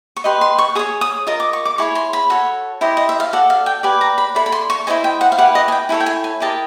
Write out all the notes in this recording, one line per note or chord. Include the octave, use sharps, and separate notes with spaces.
C#6
G4 B4 D#5 C6
C6
C#6
G#4 C#5 D#6
D#6
F4 A#4 D#5 D#6
D6
C#6
D6
E4 G#4 C#5 C#6
C6
B5
F#4 A4 C#5
E4 G4 C5 D#5
D#5
E5
F5
F#4 A4 D5 F#5
F5
G5
G4 B4 D5 G#5
A#5
B5
E4 A4 D5 B5
B5
C6
C#6
E4 G4 C5 D#5 G#5
G5
F#5
F5
E4 G4 B4 F#5
D#5
G#5
G5
E4 A4 C#5 G#5
G5
G#5
G#5
E4 G4 A#4 D#5 A5